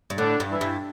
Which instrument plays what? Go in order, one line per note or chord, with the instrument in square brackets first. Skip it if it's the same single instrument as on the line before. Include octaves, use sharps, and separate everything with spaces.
[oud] G2
[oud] A2 [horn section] D3 D4
[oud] G2
[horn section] E3 E4
[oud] G2